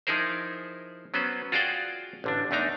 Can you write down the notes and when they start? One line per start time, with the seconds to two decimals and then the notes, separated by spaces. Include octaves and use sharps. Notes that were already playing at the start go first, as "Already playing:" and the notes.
0.07 F3 D#4 E4 G#4 A#4 C5
1.14 F#3 B3 C#4 B4 C5
1.52 F4 F#4 G#4 D5 F5 G5
2.24 A1 D3 D4
2.51 E2 A3 D4 D#4 A#5